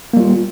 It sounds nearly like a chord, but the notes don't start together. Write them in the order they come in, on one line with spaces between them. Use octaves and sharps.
A#3 G3 F4